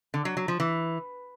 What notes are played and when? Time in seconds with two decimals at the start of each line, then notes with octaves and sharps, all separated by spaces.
0.14 D3
0.25 F#3
0.37 F#3
0.48 F3
0.60 E3